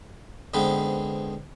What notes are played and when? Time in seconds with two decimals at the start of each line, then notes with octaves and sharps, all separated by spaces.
0.54 G#2 D3 B3 C4 B4